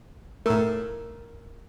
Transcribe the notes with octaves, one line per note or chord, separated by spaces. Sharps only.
A2 A3 A#4 E6